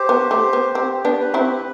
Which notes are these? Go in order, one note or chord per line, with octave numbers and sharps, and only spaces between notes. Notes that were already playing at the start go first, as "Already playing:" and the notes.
Already playing: G4 C5
B3
A3 G4
B3
C4 G4
B3 D4
B4
C4 E4